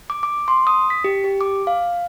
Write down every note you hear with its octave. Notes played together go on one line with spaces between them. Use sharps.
D6
D6
C6
D#6
B6
G4
G4
D6
F5